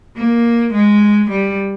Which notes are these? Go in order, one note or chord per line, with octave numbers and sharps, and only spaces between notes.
A#3
G#3
G3